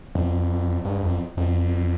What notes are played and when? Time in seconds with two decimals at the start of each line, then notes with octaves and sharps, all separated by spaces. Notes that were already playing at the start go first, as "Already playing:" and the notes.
0.15 F2
0.85 G2
1.03 F2
1.37 F2